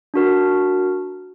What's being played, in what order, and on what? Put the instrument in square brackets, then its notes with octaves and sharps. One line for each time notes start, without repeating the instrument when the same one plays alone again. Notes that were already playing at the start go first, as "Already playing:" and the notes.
[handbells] D4 F#4 A#4